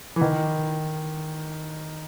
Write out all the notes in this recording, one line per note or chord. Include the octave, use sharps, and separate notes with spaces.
E3
D#3